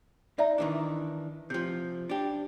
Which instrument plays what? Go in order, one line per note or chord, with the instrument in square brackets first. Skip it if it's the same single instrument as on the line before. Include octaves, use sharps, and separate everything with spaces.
[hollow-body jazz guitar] D#4 [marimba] D5 E5 A#5
[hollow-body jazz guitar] D#3 E3 D4
[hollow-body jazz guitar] C3 F3 [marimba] G6
[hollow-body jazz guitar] D4 G4